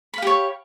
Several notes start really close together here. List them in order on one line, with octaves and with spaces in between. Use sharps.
B5 F5 G4 C#5